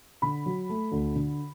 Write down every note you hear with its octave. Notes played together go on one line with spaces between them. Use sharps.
D3 B5
F#3
A3
D2
D3